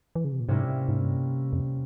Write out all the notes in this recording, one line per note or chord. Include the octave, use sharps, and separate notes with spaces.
E3
C#3
C3
A#2
G#2 C3 G3 A#3 C#4 E4
G#2
G2
F2